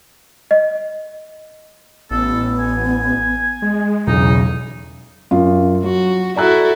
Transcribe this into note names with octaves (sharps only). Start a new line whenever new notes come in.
D#5
A1 B3 A4
G#5
G#3
B1 E2 C#3 D#4
F#2 F4
F#3 F#4
E4 F#4 A4 D5 A#5 F#6